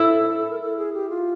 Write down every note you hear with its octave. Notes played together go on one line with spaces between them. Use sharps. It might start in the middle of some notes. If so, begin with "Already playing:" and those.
Already playing: E4 A4
A#4
A4
G#4
G4
F4